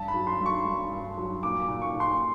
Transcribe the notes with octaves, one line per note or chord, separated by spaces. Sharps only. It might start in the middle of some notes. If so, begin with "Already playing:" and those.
Already playing: G2 A5
B5
F#3
C6
G2
C#6
G2
G2
F#3
A#2 D6
D6
A#2
C#6
A#2
C6